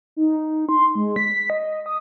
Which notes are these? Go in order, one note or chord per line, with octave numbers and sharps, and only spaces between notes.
D#4
C6
G#3
B6
D#5
D#6